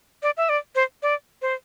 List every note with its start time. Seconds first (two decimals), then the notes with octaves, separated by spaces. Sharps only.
0.23 D5
0.37 E5
0.49 D5
0.75 C5
1.03 D5
1.42 C5